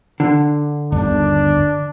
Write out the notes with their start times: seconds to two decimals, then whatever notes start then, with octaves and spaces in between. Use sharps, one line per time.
0.20 D3
0.92 G1 D#2 D4